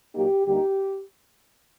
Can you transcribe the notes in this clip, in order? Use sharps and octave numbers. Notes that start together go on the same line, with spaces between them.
A#2 F#3 A#3 D#4 G4
D2 D3 G3 A#3 D#4 G4